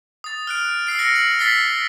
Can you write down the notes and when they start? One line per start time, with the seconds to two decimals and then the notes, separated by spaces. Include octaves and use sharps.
0.24 D#6 A6
0.47 F6 F#6 D7
0.87 E6 F6 C7 D7
0.99 F6 F#6 A#6 C#7
1.15 F#7
1.39 E6 A6 B6 C7 F#7 G7